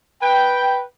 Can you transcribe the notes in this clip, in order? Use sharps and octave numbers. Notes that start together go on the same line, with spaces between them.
B4 G5